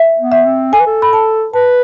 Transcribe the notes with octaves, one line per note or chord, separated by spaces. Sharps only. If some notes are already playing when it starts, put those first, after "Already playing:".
Already playing: E5
B3
E5
C4
A4 G#5
B4
A4
B5
A5
B4 A5